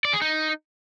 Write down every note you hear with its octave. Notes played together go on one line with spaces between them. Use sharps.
D5
G#4
D#4